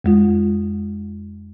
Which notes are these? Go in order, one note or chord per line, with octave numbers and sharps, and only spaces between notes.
F2 G#3 F4